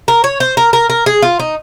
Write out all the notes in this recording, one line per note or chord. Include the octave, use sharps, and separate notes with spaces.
A#4
C#5
C5
A#4
A#4
A#4
G#4
F4
D#4